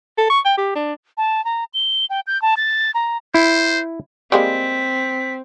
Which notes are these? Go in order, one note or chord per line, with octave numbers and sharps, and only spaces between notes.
A4
C#6
G5
G4
D4
A5
A#5
G7
G5
G6
A5
A6
A#5
E4 C5
G3 G#3 A#3 C4 B6